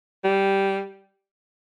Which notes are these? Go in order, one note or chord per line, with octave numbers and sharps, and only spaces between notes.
G3